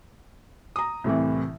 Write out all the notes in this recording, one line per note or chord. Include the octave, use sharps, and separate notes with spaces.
A#5 D#6
C2 A2 C3 E3